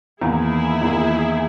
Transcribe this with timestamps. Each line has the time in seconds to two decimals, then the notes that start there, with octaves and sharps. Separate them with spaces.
0.21 E2 D#3 A#3 E4 G#4
0.81 E2 D#3 A#3